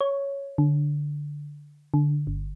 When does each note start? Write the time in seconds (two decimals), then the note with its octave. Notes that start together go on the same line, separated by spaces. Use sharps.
0.01 C#5
0.58 D3
1.94 D3
2.27 G1